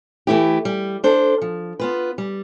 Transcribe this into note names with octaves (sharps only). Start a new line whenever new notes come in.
E3 A3 E4 G4
G3
D4 A4 C5
F3
B3 F4 B4
G3